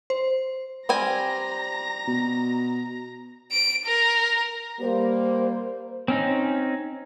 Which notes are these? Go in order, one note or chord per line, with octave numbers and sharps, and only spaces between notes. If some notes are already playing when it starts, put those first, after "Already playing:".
C5
G3 C4 G#5 A#5 A#6
B2
D7
A#4
G3 A#3 C5
C4 C#4 D#4